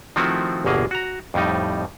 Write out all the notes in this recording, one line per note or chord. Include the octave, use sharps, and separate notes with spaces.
D#3 F3 A3 C4 E4 F#4
G1 E2 B2 A#3 G#4
F#4 A#5
F2 A2 G3 D#4